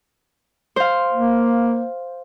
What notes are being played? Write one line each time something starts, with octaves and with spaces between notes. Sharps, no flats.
C5 F5
A#3